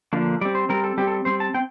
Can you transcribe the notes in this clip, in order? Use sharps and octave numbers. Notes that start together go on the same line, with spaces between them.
D3 F3 A#3 D4
G3 C4 D5
C5
G3 C4 A#4
A4
G3 C4 G4
A4
G3 C4 C5
A5
C4 G5